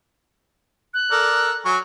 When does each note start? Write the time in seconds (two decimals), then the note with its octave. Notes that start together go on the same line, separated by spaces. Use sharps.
0.94 F#6
1.11 A4 A#4 D5
1.65 F#3 G#5 C#6